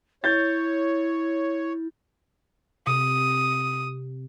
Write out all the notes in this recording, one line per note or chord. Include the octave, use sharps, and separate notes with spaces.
E4 C#5 G6 A6
C3 D#6